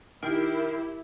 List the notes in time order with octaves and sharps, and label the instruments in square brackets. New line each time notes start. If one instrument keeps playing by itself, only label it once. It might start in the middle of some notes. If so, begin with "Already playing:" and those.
[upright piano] D#3 [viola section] E4 G4 [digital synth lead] A#4